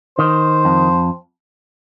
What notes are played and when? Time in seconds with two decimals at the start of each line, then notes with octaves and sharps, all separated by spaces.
0.18 D#3 C5
0.65 F2